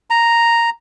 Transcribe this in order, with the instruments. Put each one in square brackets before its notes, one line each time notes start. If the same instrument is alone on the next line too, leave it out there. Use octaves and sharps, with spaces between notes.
[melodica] A#5